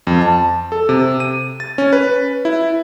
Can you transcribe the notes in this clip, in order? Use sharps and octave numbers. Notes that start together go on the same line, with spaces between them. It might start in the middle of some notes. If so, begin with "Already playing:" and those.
F2
A5
A4
C3
D#7
A6
C#4
B4
E4